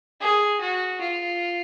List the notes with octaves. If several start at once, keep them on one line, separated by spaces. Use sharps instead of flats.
G#4
F#4
F4